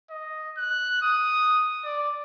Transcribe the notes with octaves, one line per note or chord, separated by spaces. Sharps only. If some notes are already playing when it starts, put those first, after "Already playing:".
D#5
F#6
D#6
D5